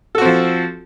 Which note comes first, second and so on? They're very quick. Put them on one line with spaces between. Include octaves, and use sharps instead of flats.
A4 F#4 C4 F3